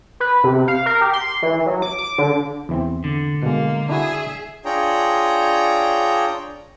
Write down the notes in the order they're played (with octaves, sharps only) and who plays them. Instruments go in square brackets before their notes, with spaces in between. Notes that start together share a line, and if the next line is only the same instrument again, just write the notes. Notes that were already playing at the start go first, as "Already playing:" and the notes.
[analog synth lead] B4
C3
F5
A#4
G4
C6
E3
F#3
D6
D6
D3
[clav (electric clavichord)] E2 E3 C4
[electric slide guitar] D3
[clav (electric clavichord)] B2 G#3 [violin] A#3
[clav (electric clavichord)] D4 E4 F#4 [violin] G#4 E5
[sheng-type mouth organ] D4 F4 G#4 C#5 G5 A#5